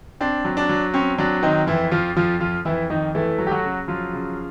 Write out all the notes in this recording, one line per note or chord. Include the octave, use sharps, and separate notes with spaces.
C4 D4
F#3
D4
F#3
C4 C#4
F#3 D4
D#3 C4 D#4
F2 E3 E4
F2 F3 F4
F2 F3 F4
F3 F4
F2 E3 E4
F2 D#3 D#4
E3 A3 E4
F#3
G4
F#3 F#4
C#3
F3 F#3 F4
C#3